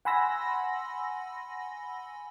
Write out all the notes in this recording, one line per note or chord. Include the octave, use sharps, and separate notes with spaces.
F#5 G#5 B5 C6 E6 A#6